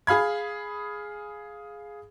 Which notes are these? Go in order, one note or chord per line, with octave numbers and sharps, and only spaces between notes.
G#4 F5 B5 G#6